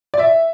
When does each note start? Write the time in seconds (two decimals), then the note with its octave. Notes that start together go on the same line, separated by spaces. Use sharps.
0.14 D5
0.19 E5